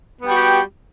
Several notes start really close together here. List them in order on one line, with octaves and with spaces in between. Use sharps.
B3 G3 F#4 G4